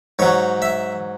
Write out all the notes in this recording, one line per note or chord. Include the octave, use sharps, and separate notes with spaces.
G#2 F#3 C#5
E5